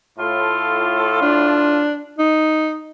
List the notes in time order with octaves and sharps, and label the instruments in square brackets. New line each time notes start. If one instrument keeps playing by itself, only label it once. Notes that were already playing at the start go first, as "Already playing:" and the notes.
[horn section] A2 F4 [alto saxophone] A4
[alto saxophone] D4
D#4